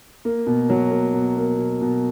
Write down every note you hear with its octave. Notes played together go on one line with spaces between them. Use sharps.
A#3
B2
F#3
A#3
B2
A#3
B2
B2